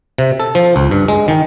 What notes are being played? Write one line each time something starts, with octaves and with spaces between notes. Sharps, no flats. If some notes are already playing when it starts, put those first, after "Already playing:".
C3
A4
F3
C#2
G2
G#3
D#3